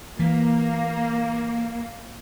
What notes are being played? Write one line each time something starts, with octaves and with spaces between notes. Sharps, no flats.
E3 A#3